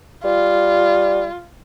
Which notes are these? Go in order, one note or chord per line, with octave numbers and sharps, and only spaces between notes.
G3 F4